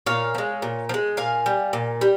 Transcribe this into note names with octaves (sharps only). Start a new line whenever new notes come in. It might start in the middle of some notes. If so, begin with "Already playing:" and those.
A#2 C#5 F5
F3
G#3
A#2
F3
G#3
A#2 F5 G#5
G3
A#2
G3